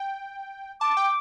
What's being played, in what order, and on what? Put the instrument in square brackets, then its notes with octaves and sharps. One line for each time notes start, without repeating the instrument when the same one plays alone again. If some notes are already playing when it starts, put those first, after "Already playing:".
Already playing: [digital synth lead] G5
[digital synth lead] A5 [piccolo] D6
[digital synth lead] G5